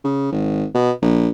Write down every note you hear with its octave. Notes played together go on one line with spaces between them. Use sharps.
C#3
G#1
B2
A#1